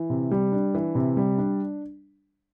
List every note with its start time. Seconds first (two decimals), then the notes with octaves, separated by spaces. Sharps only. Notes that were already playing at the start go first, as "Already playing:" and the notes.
Already playing: E3
0.10 C3
0.31 G3
0.52 D4
0.75 E3
0.95 C3
1.17 G3
1.38 D4